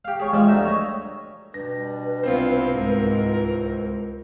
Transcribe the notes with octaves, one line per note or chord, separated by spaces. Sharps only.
G4 F5
G#4 C#5 C#6
E3 F3 G3 G#3
D2 D#4 E5
C#5 D#5
B2 G3 D4 B4 A#6
C2 B3 C4 F4 C5
C#2 G#2 A#4